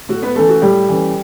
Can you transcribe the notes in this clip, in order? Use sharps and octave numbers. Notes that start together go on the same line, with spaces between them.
A2 F#4
B3 B4
E3 A3 C#4 A4
F#4
A2 G3 G4
E3 A3 C#4